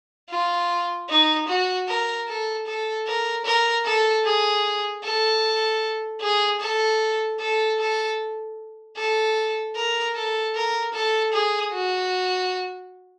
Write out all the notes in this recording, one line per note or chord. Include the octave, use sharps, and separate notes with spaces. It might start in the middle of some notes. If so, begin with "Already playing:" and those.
F4
D#4
F#4
A#4
A4
A4
A#4
A#4
A4
G#4
A4
G#4
A4
A4
A4
A4
A#4
A4
A#4
A4
G#4
F#4